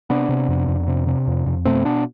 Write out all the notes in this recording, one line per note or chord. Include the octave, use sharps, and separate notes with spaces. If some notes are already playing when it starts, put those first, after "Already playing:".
C3 B3 D4
C3
F2
F2
C3
C3
F2
F2
B2 A3 C4
B2 B3 D4